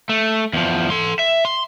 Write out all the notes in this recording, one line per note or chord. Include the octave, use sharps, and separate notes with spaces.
A3
E2 F3
A4 C6
E5
C6